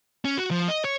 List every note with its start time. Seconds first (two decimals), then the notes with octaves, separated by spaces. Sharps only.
0.25 C#4
0.38 F#4
0.51 F3
0.68 D#5
0.84 C#5